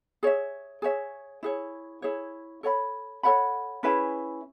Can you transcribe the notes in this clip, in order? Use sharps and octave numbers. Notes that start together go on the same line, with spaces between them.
G#4 C#5 E5
G#4 C#5 E5
E4 G#4 C#5
E4 G#4 C#5
A4 C#5 F#5 B5
A4 C#5 F#5 B5
C#4 E4 G#4 B4